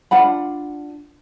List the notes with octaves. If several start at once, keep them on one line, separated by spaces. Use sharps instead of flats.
D4 F4 F#5 B5